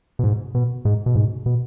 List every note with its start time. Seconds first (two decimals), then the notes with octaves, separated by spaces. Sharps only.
0.19 B2
0.24 G#2
0.55 B2
0.85 G#2
1.06 B2
1.15 G#2
1.46 B2